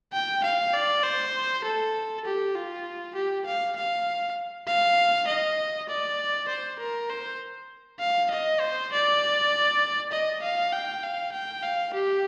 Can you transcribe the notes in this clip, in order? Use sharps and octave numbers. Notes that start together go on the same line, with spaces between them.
G5
F5
D5
C5
A4
G4
F4
G4
F5
F5
F5
D#5
D5
C5
A#4
C5
F5
D#5
C5
D5
D#5
F5
G5
F5
G5
F5
G4